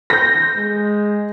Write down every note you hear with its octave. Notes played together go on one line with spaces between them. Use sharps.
G6 A#6
G#3